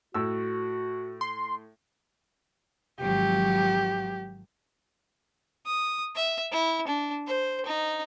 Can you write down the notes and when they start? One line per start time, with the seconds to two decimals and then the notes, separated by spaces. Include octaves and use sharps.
0.14 A2 F#4 E6
1.21 C6
3.01 G#1 F3 F#3 G4
5.66 D#6
6.16 E5
6.52 E4
6.88 D4
7.27 C5
7.66 D#4